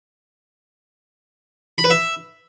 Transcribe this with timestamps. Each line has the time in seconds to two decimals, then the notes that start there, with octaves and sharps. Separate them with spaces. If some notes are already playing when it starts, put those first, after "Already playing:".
1.78 B5
1.84 B4
1.90 E5